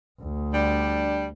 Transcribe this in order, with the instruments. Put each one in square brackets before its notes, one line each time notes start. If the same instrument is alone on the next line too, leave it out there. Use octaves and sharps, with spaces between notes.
[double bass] D2
[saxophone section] G3 D4